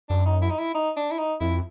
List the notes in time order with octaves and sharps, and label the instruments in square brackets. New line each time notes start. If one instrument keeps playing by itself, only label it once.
[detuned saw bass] F#2 [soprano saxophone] D4
[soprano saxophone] D#4
E4
D#4
E4
D#4
D4
E4
D#4
[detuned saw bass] F2 [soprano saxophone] E4